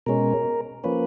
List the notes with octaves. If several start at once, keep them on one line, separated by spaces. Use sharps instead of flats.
B2 G#3 C#4 A#4
F3 A#3 C#4 B4